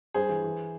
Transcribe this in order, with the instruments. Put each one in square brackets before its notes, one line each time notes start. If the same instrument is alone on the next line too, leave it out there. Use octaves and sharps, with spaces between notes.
[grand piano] G2 G#4 C5
E3
E3